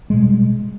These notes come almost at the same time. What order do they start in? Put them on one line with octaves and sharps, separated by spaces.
G#3 B2 G3